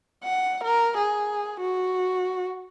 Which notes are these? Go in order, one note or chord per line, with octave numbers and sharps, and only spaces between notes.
F#5
A#4
G#4
F#4